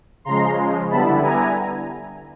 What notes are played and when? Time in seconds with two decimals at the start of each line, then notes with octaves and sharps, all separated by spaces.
0.25 C#3 F3 G#3 A#5 C6
0.90 D3 G3 B3 E4 A5 B5
1.22 G#5 A#5